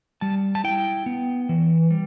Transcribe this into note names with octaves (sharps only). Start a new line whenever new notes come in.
G3 A5
A5
E4 G5
B3
E3
G3